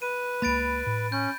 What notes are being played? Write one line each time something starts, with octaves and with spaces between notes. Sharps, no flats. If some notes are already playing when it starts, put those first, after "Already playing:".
B4 D#7
C#2 A#3 B5 A6 D7
A2
C#4 G6